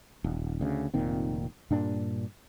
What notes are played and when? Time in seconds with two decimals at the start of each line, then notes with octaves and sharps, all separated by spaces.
0.24 D#1
0.61 D2 C#3
0.94 F1 A#2 D#3 C4
1.71 G2 A#2 D4